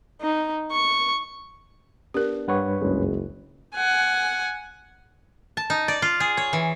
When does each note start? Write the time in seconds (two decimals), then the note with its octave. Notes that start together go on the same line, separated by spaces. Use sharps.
0.21 D#4
0.71 C#6
2.14 B3 D4 G4 A#4
2.48 G2 B4 C#5 F#5 C#6
2.81 F#1 C#2 G#3
3.75 F#5 G#5
5.57 A5
5.70 D#4
5.88 D5
6.02 F4
6.20 G#4
6.37 C#5
6.53 E3